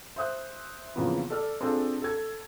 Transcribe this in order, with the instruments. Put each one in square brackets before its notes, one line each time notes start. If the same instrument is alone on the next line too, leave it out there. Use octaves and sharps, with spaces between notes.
[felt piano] C5 E5 D#6 F#6
F2 C#3 E3 F3 A#3 B3
A4 D5 F6
C4 D4 F4 G#4 A4
A4 G#6